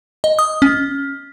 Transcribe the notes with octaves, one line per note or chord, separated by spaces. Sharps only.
D#5
D#6
C#4